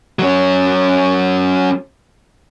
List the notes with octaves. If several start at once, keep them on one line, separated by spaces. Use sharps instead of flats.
F#3 C#4